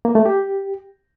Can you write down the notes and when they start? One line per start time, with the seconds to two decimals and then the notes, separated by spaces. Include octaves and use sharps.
0.05 A#3
0.15 A3
0.26 G4